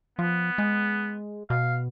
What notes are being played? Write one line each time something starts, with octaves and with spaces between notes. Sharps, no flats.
F3 B3
G#3
B2 F5